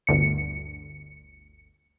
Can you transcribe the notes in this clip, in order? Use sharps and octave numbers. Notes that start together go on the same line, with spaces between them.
G1 D2 C#7